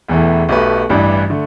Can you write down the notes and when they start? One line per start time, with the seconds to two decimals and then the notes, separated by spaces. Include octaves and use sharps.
0.08 E1 E2 E3 A3 E4
0.49 B1 B2 A3 G4 B4
0.89 A1 G2 E3 G3 D4
1.30 D3 A3